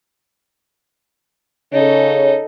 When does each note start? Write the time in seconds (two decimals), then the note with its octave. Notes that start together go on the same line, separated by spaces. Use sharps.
1.72 C#3 D#4 A4 C#5